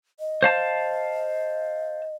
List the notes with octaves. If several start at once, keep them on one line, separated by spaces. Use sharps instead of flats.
D#5
C5 F5 A5